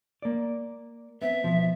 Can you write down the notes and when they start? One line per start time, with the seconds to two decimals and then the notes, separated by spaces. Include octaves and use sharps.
0.22 A#3 D5
1.22 B3 C4 E5
1.44 B2 F3